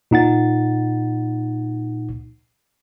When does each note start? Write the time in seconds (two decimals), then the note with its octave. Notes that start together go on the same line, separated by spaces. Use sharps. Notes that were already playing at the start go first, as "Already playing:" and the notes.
0.11 A#2 D#4 F#5 A6